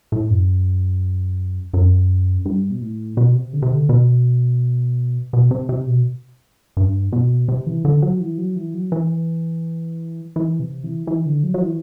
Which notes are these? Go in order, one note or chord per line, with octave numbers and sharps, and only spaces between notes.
A2
F#2
F#2
G2
B2
A2
B2
C3
D3
C3
D3
B2
B2
C3
C3
B2
G2
B2
C3
E3
D3
F#3
E3
F#3
E3
F#3
E3
E3
C3
E3
E3
D3
F#3
F#3
E3